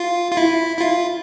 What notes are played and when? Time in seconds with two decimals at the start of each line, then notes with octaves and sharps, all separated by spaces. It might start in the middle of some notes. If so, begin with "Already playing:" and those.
Already playing: F4
0.32 F4
0.37 E4
0.77 E4
0.81 F4